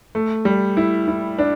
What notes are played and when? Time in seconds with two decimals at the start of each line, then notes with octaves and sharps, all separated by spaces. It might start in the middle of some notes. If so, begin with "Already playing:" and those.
0.15 A3
0.45 G3
0.77 E4
1.08 E4
1.38 D4